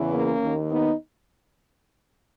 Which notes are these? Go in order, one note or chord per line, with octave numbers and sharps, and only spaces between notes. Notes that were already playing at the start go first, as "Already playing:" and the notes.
Already playing: E2 C#3 E3
A#3 C#4
D#2 D#3
B3 D#4